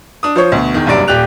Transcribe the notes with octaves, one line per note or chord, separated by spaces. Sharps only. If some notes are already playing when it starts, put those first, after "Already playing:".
D4 D#6
F3 C5 C#5
D2 B2
E2 D#3
F#1 C2 G2 F#3 D5 D7
D#1 G4 D5 F#6 F7